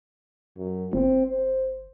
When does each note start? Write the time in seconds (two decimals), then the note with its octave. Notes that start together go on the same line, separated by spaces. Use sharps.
0.57 F#2
0.93 G1 C4
1.27 C5